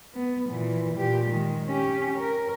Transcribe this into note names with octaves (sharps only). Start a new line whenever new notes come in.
B3
A#2 E3
A#2 G4
D#3 G#3
C#4 G4
A#4